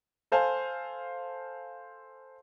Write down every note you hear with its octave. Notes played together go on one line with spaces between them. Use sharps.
A4 C5 F5 G#5 A5